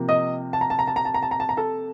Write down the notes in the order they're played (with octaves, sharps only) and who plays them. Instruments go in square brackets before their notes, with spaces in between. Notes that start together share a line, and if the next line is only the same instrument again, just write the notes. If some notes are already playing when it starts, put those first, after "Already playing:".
Already playing: [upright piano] C3 F3 A#3
D#5 D#6
A5
A#5
A5
A#5
A5
A#5
A5
A#5
A5
A#5
A5
A#5
A4 A5